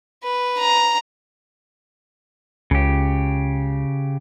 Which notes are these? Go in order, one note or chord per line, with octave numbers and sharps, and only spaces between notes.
B4
A#5
C#2 C#3 G4